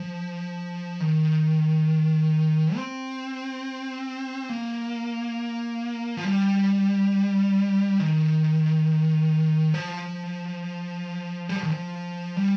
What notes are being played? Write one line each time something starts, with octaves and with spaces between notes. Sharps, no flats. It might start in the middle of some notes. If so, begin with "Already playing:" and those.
Already playing: F3
D#3
C4
A#3
F3
G3
D#3
F3
G3
F3
D#3
F3
G3